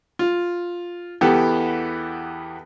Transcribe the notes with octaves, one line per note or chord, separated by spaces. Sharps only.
F4
E2 E3 B3 G4 A4 G5